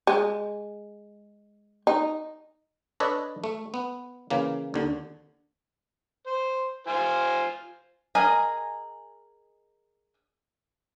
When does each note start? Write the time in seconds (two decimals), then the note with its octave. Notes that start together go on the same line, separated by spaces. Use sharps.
0.07 G#3
1.87 D#4
3.00 D4 A4 B4 C#5 D#5
3.44 A3
3.74 B3
4.30 C#3 E3 A#3
4.74 D#2 D3
6.27 C5
6.87 F4 C5 G#5
8.15 G#4 A#4 D#5 G#5